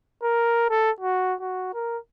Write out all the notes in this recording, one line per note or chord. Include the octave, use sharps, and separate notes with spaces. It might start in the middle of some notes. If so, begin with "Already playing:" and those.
A#4
A4
F#4
F#4
A#4